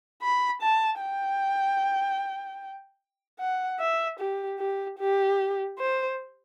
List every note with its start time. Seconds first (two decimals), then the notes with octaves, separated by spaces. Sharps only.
0.22 B5
0.62 A5
1.01 G5
3.40 F#5
3.80 E5
4.19 G4
4.59 G4
4.99 G4
5.79 C5